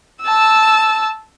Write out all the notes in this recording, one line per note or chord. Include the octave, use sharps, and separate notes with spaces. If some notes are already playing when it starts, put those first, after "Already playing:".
A5 E6